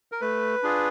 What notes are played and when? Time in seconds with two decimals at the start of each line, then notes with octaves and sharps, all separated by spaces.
0.12 A#4
0.21 A3 B4
0.63 D4 F4 G#4